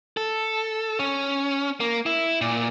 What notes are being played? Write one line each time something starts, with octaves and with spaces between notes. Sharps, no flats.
A4
C#4
A#3
E4
A#2